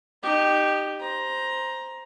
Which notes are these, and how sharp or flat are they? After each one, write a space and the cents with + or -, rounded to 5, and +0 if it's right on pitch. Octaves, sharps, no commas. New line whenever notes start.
D#4 -25 G4 +0
C5 +0 A#5 +15